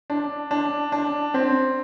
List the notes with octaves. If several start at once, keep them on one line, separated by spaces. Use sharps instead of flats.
D4
D4
D4
C4